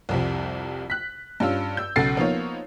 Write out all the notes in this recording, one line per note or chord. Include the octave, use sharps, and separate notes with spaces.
C2 F2 C3
F#6 B6
G2 C#4 F4 E6
E6 G6
B1 C#3 A4 F#5 A6 C7
F3 A#3 B3 D#4 F4 C#5